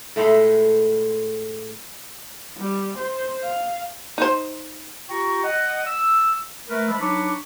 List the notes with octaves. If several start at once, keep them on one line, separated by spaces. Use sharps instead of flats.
A2 G#3 A3 A4
G3
C5
F5
D#4 C5
F4 G4 G5 A#5 C#6
D#5 F#5
E6
A3 A#4 B4
F3 G#3 B4 E5 A5 B5
F#3 D4 D#4 B4 C#6 D6